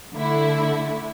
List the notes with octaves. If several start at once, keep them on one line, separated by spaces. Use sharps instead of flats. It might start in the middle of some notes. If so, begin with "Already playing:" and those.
D3 A3 E4